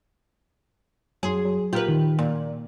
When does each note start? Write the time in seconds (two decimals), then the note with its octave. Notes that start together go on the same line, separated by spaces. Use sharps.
1.23 F#2 F#3 G#4 C6
1.45 F#3
1.73 A#2 F4 G4 A#4 B4
1.88 D#3
2.19 A#2 A#3